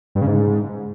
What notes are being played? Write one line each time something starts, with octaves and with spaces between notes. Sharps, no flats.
G2
C#3
G#2